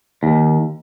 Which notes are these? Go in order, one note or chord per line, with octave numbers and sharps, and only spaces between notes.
D#2